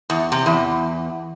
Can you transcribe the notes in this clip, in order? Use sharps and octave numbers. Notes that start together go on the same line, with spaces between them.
E2
C3
E2